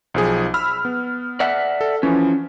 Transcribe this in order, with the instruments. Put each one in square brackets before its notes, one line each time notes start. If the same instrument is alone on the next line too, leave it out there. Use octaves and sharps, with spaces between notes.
[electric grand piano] B1 F3 G#4
B5 E6 F6
B3
[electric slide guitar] D5 E5 F#5
[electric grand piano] A4
[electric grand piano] E3 F3 [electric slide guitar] C#4